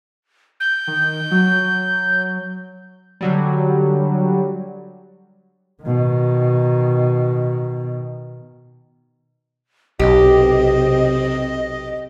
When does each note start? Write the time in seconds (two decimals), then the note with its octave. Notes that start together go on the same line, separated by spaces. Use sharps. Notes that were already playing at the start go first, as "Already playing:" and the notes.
0.60 G6
0.87 D#3
1.31 F#3
3.21 D3 F#3 G3
5.83 B2 D#3
9.99 B1 C3 C4 G4 D#5